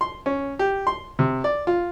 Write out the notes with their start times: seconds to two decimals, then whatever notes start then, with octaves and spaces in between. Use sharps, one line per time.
0.01 C6
0.26 C#4
0.59 G4
0.87 C6
1.19 C3
1.44 D5
1.67 F4